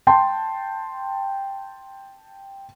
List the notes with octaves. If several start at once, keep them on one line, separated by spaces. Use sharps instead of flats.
G5 A5 C6